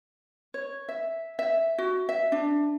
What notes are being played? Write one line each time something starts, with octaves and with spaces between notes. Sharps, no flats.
C#5
E5
E5
F#4
E5
D4